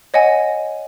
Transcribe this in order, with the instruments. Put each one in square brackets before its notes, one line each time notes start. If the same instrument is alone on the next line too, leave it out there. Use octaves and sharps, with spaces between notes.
[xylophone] C#5 D#5 F#5 G#5